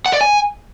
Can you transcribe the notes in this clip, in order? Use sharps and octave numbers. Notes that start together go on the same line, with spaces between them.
F#5
D5
G#5